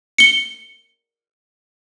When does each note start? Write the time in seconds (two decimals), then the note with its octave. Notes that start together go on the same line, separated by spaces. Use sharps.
0.18 C#7 G7